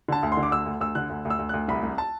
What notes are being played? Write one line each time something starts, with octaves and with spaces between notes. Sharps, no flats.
D3 A5
D2
C6
D3
D6
D2 E6
D2
D2 E6
D3 F#6
D2
D2
E6
D2
D2 F#6
C2 B5
C2
A5